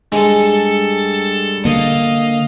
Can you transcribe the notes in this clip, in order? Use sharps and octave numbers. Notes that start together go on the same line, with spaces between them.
G2 G#3 A4
D3 A#3 D#5 F5